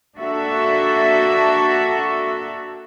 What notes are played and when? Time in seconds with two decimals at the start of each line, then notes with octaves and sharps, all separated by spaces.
0.16 A#3 D4 F#4 A4 E5